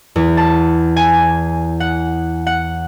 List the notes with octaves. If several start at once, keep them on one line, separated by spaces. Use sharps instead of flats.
E2
A5
G#5
F#5
F#5